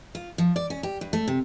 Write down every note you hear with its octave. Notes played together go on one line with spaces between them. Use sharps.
F4
F3
D5
C#4
G4
G2
A3
C3